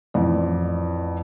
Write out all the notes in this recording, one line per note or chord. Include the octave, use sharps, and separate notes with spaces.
A1 F2 D5